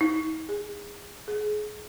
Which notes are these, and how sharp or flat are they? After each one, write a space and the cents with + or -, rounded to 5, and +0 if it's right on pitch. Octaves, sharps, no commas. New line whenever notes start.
D#4 +40
G#4 -25
G#4 +30